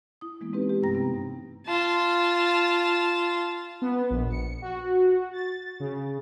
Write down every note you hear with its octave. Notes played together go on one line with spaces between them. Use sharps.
E4 D#6
E3 G#3 A#3 B3
G#3 C4 D#4 G4 B4
G4
G2 C3 A3 G5 A#5 A#6
C3 B3 C4
F4 A5
B3
A#1
C#7
F#4
F#4
A6
C#3